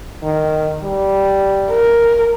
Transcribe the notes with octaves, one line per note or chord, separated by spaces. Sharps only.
D#3
G3
A#4